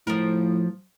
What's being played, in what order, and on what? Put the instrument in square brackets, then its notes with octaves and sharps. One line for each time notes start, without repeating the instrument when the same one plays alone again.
[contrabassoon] A2 [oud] F3 A#4